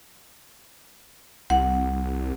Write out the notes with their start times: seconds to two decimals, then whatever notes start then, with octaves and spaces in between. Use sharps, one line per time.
1.50 C2 F#5